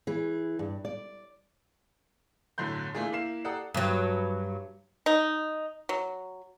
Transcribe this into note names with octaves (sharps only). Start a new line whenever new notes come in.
E3 G#4
G2
D5
G1 A2 D3 F#3 C6 G6
A#2 E3 A3 A#3 D4 G#4
A#3 E4 F5 C7 E7
G4 A4 D5 F#5 A#5 D#6
G2 F#3
D#4
F#3